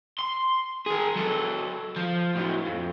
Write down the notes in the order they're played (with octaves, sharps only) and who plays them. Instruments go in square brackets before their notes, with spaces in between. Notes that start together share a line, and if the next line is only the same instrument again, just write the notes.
[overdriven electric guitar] C6
G#4 A#4
F#3 A4
F3
A2 F#3
F2